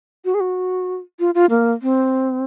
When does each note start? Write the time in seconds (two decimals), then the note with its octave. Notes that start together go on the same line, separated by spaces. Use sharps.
0.25 F#4
0.34 G#4
0.40 F#4
1.20 F4
1.35 F4
1.50 A#3
1.82 C4